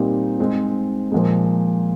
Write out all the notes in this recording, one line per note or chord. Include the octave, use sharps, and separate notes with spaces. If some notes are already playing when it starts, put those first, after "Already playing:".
Already playing: A#2 G3 C4 D#4
G#3 C4 D#4
A#2 F3 G#3